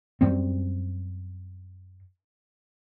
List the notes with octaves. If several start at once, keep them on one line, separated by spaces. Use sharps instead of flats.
F#2 G3 C4